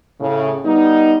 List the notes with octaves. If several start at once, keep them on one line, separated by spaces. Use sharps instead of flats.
A2 C#3
G3 B3 D#4